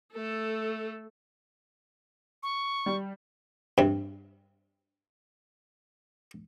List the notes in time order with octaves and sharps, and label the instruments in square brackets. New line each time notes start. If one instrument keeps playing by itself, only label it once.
[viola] A3 A4
[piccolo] C#6
[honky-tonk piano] G3
[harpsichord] G2 C3